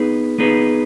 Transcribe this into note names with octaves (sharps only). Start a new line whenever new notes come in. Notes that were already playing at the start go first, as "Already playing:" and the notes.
Already playing: B3 D#4 G#4 B4
B3 D#4 G#4 B4